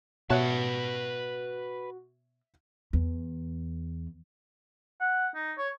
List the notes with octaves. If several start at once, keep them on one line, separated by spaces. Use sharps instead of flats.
B2 F#4 B4 C#5 E5 A5 F#6
E2
F#5
D#4
C#5